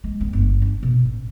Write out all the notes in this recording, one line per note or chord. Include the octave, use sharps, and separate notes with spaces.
G#3
C4
G1
D4
B2
A1